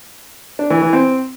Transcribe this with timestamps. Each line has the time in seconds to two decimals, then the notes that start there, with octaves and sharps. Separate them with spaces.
0.59 D4
0.70 E3
0.82 E3
0.93 C4